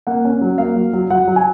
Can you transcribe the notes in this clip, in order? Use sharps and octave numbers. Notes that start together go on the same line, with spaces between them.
A#3 F#5
C#4
F#3
A#3 F5
F#3
F#3
F#3 F#5
F#3
G#5